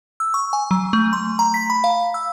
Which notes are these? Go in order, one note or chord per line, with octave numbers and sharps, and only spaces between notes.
E6
C#6
G#5
F#3
A3
C6
A#5
B6
B5
F5
E6